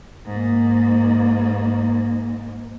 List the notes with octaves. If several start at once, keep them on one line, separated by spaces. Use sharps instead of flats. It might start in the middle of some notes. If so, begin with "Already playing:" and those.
G#2 A#3